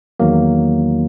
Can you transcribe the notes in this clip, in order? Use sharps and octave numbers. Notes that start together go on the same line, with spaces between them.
E2 D#3 F#3 A#3